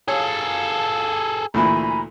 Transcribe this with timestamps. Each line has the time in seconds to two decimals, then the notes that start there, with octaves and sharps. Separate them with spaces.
0.08 G#4 A4 C#5 F5
1.54 D2 A#2 E3 G#5 A#5 B5